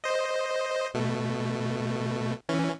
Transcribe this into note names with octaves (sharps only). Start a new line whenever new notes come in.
C5 D#5
B2 A3
E3 C#4